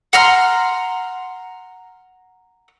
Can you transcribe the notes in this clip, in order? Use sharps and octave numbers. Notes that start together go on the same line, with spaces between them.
F#5 A#5 C6 F6